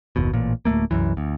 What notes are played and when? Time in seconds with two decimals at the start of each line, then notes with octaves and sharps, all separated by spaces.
0.16 F#1 D#2 B2
0.33 A1 A#2
0.65 D1 G#1 A3 A#3
0.91 C2 F#2 E3
1.17 D2